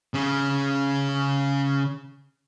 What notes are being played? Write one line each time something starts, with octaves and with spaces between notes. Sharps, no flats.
C#3 C#4